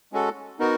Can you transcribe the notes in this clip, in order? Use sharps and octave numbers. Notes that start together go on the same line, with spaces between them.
G#3 C#4 F#4 A4
B3 D#4 F#4 A#4